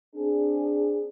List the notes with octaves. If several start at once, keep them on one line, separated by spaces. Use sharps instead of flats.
C4 D4 G#4